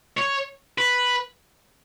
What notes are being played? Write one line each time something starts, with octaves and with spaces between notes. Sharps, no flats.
C#5
B4